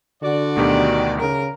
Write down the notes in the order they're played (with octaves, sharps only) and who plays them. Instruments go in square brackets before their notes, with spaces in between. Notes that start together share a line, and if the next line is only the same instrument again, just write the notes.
[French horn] D3 [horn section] F#4 D5
[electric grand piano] D2 B2 G4 [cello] D#3
[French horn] C#3 [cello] A#4